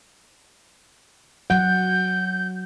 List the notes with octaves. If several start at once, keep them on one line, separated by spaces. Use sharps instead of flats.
F#3 F#5 G6